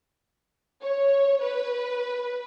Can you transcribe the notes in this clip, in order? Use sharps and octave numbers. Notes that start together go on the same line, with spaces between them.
C#5
B4